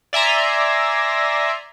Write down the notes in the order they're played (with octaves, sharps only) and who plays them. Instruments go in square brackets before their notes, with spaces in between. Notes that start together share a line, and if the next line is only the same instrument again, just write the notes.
[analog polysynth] D5 E5 G#5 A#5 C6